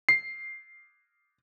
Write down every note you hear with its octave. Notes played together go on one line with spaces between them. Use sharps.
C7